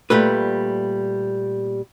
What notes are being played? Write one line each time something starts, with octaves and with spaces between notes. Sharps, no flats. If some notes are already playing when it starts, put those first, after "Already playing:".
A#2 G3 A3 B4